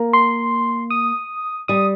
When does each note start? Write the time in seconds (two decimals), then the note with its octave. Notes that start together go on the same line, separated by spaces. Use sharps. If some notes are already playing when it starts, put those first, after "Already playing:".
Already playing: A#3
0.13 C6
0.90 D#6
1.68 G3 D#6